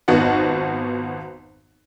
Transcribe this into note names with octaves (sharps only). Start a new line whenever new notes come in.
G#1 F2 B3 F#4 D#5 F#5